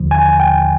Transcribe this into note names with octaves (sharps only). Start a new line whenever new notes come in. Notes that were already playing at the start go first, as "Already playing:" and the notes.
Already playing: D#2 D3 F3
G#5
G5